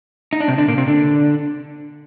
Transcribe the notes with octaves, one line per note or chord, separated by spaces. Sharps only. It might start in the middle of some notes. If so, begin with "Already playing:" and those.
D#4
D4
C3 C4
D3 D4
A#2 A#3
C3 C4
D3 D4